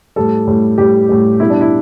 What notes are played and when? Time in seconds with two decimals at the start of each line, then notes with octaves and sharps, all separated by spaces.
0.16 A2 G3 A4
0.47 A2 G3
0.78 A2 G3 G4
1.09 A2 G3
1.40 B2 G3 E4
1.50 D4
1.61 E4